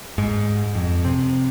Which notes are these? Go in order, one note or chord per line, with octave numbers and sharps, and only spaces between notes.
G#2
F2
C3